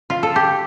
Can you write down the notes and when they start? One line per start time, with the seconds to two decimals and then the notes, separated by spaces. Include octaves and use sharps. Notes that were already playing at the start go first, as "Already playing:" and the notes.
0.10 F4
0.23 A4
0.36 G4